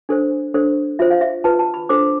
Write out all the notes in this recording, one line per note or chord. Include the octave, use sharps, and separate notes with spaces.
D4 A4 C5
D4 A4 C5
F4 C5 E5
F5
E5
F4 B4 A5
A5
B5
D4 A4 C5 D6